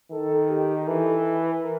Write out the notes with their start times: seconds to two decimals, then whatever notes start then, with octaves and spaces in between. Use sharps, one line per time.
0.11 D#3 A4
0.49 G4
0.87 E3 A4
1.24 B4
1.62 A#4